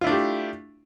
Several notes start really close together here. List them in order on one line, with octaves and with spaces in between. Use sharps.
F4 E4 D4 A3 G4